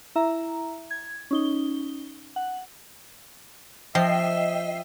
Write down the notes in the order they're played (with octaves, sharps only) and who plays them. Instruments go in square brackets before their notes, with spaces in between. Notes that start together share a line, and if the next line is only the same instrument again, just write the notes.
[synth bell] E4 E5 A#5
G#6
C#4 D#4 G7
F#5
[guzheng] F3 [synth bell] D#5 G5 C7 [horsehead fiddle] E5